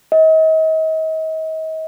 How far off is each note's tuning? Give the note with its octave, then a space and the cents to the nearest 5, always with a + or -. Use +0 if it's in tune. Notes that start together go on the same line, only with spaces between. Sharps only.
D#5 +40